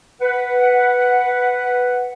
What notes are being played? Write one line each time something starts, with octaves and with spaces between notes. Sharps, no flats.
B4 F#5